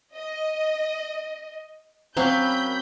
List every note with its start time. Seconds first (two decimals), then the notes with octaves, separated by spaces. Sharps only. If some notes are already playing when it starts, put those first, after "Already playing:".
0.15 D#5
2.17 F#3 A#3 C4 C#4 B5 C6 G6